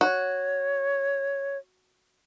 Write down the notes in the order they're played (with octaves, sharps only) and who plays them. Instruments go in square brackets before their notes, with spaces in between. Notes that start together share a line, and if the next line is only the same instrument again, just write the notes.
[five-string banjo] F#4 [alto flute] C#5